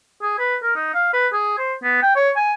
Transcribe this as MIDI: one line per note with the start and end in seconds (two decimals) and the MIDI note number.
0.22 0.38 68
0.39 0.56 71
0.63 0.74 70
0.76 0.94 63
0.94 1.09 77
1.13 1.28 71
1.33 1.57 68
1.58 1.74 72
1.83 2.00 59
2.02 2.14 79
2.16 2.30 73
2.36 2.53 80